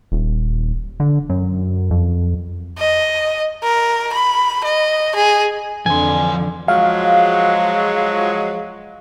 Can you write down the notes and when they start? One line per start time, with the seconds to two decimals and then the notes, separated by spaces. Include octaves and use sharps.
0.12 D#1
1.00 D3
1.29 F#2
1.91 F2
2.79 D#5
3.64 A#4
4.13 B5
4.64 D#5
5.16 G#4
5.86 F2 D3 E3 G#5 C6
6.68 F3 F#3 G#3 F5